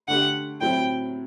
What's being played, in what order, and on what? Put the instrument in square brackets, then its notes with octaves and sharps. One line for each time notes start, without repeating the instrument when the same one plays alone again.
[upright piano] D3 A3 D4 G4 [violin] F#5
[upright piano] A2 F#3 C4 E4 [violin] G5